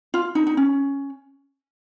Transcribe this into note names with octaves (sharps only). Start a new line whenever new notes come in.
F4
D#4
D#4
C#4